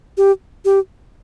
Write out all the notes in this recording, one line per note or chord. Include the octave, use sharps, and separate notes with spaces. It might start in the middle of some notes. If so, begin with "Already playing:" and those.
G4
G4